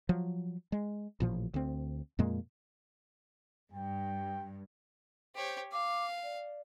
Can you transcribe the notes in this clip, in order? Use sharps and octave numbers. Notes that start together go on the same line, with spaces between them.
F3 F#3
G#3
A1 A#2 F3
D2 C4
F2 A#2 G#3 A#3
G2 G5
G4 C5 C#5
F5 D6
D5